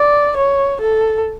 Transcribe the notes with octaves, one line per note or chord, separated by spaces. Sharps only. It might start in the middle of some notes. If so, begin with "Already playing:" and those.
Already playing: D5
C#5
A4